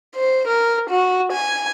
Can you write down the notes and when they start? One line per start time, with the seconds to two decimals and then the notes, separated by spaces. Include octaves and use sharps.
0.15 C5
0.48 A#4
0.90 F#4
1.32 G#5